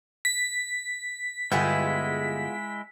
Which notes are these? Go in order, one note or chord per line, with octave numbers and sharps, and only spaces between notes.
B6
G1 G#3 B3 E4 F4 G#4 G5